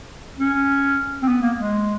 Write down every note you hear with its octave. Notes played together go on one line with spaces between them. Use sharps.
C#4
C4
B3
A#3
G#3